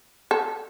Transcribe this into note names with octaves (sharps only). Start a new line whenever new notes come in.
A4